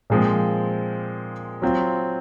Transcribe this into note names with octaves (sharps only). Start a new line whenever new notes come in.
A#2 F3 G#3 C4
F#3 C4 F4